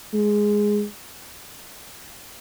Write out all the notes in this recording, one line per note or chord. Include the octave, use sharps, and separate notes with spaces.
G#3